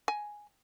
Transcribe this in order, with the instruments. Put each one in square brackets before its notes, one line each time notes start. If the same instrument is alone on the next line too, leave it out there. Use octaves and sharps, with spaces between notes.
[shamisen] G#5